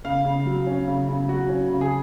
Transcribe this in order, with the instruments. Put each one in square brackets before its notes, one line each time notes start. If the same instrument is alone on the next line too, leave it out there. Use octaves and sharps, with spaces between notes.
[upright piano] C#3 [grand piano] F5
[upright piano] C#3
F#3
C#4
C#3
C#3
[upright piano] F#3 [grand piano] F#4
[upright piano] C#4
C#3
[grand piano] G#4